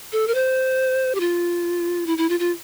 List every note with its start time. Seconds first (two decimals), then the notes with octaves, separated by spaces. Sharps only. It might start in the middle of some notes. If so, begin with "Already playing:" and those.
0.12 A4
0.28 A#4
0.35 C5
1.15 G4
1.20 F4
2.07 E4
2.18 E4
2.29 F4
2.40 F4